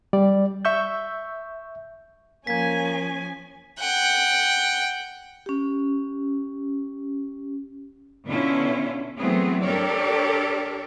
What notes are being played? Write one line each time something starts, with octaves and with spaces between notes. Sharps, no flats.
G3 D5
E5 C#6 E6 G6
F3 A#3 C#4 G#5 G#6 B6
F#5 G5
C#4 G4
B2 D3 B3 C#4 E4 F4
E3 F#3 A3 B3 C4 G#4
D4 G4 A4 A#4 C#5 D5